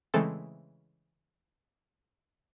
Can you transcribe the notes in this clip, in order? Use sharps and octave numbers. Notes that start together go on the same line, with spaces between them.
C#3 E3 G#3 A3 C4 A4